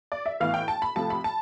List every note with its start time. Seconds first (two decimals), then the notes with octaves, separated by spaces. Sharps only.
0.12 D5
0.26 E5
0.40 A2 E3 B3 F5
0.54 G5
0.68 A5
0.82 B5
0.96 C3 F3 A3 A5
1.10 B5
1.24 A5